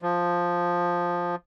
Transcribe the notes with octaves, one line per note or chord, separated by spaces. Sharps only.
F3